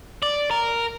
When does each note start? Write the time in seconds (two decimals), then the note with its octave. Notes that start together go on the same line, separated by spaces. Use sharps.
0.23 D5
0.51 A#4